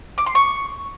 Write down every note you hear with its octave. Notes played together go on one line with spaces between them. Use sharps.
D6
C6
C#6